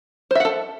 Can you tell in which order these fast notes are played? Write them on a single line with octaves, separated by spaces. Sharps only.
C5 E5 F#5 A4